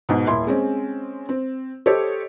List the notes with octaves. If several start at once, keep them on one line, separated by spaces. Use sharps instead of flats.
G#2 B2
D#1 E4 C6
G#3 C4 C#4
C4
G4 A4 C5 C#5 D#5